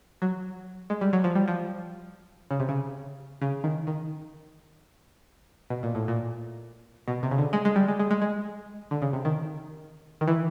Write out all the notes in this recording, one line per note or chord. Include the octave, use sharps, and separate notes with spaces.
F#3
G#3
G3
F#3
F3
G3
F3
C#3
C3
C#3
C#3
D#3
D#3
B2
A#2
A2
A#2
B2
C3
C#3
D3
G#3
G#3
G3
G#3
G#3
G#3
G#3
D3
C#3
C3
D#3
D#3
E3